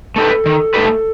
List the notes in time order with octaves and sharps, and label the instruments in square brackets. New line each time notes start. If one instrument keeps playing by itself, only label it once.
[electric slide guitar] A3 D#4 G4 B4 [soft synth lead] A4
[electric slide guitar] D#3
A3 D#4 G4 B4